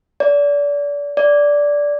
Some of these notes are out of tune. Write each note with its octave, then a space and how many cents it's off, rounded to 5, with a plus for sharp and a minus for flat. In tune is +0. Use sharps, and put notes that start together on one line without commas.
D5 -30
D5 -10